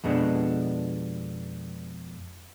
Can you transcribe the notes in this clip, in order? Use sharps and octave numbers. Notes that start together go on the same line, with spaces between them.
F2 B2 G#3 B3 D4